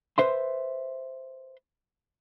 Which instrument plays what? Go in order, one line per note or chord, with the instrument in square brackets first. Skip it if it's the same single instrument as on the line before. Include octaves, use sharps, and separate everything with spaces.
[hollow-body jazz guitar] B4 C5 E5 C6